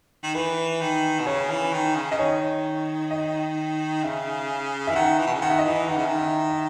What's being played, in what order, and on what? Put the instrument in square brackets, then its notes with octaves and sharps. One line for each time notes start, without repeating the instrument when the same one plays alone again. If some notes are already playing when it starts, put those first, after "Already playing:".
[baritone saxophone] D#3
[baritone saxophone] E3 [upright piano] B4
[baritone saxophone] D#3
B2
[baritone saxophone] C#3 [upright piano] C#5
[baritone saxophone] E3
D#3
C#3
[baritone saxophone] C#3 [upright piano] D#5
[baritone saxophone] D#3 [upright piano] C#5
[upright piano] D#5
[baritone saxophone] C#3 [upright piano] E5
[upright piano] E5
[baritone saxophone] E3
[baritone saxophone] D#3 [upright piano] F#5
[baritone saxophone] E3
B2
C#3
[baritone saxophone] D#3 [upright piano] F#5
[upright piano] E5
D#5
[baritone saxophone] E3 [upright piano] E5
[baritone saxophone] D#3 [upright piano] F#5
[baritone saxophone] C#3
D#3
[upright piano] E5
E5